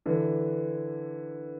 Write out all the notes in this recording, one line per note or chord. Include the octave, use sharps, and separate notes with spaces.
D3 E3